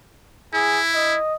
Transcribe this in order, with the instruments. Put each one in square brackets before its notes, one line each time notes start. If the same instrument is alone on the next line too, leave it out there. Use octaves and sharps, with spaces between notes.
[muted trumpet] E4 [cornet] G#4
[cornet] D#5